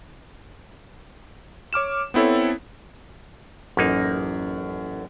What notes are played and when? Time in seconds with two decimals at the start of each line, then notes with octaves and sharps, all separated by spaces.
1.73 C#5 D6 F6 E7
2.14 B3 C4 E4 A4 C#5
3.77 A1 F#2 A#3 D#4